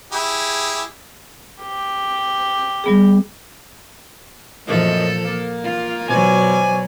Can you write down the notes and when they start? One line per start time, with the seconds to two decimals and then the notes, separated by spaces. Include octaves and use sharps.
0.12 E4 G4 G#4
1.62 G4
2.84 G3 B3 G#4
4.67 F#2 A#2 F3 A4 D#5
5.25 A#3
5.64 F4
6.08 B2 F#3 C5 D5 G#5